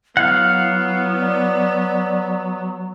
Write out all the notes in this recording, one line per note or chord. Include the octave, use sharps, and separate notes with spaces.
F#3 B3 E4 F5 F#5
D5